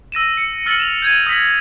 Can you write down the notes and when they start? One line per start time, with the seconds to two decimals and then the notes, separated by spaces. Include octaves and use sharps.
0.12 E6 A#6 D#7 E7
0.37 C#7
0.66 E6 F6 A6 C#7 F#7
0.79 E7 F7
1.02 G6 G#6 D#7
1.26 D#6 A#6 B6 F#7